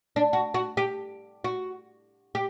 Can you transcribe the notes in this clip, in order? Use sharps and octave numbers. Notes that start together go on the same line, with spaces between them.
D4
F#4
F#4
G4
F#4
G4